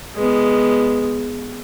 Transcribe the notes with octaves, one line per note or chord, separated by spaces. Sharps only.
G#3 B3